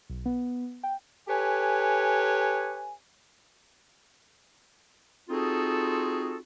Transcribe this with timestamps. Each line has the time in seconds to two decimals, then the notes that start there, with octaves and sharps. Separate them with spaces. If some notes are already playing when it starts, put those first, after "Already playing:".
0.10 B1
0.25 B3
0.83 G5
1.28 G4 A4 B4 C#5 G#5
5.29 C4 D#4 F4 F#4 G#4 A4